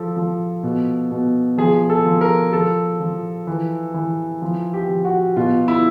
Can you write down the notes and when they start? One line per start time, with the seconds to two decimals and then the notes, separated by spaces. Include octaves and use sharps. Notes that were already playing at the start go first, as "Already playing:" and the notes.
Already playing: F3 A4
0.16 F3
0.63 B2
1.11 B2
1.58 F3 G#4
1.90 A4
2.05 F3
2.21 A#4
2.53 F3 A4
3.00 F3
3.47 E3
3.94 E3
4.42 F3
4.73 G4
4.89 F3
5.05 F#4
5.36 B2 F4
5.68 E4